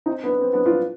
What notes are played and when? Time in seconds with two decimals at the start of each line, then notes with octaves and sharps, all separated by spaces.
0.06 C4 D#4
0.24 B3 D4
0.41 C4
0.53 B3 D4
0.66 D4 F4